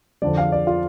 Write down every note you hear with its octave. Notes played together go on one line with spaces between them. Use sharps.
F2 D3 F3 D5
F5
D5
F4